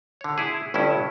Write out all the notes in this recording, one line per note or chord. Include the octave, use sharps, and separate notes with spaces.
D3 C#5
E4 G#4
G1 G2 C#4 E4